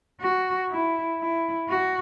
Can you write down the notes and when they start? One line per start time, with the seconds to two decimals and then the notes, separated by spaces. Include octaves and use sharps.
0.21 F#4
0.70 E4
1.19 E4
1.69 F#4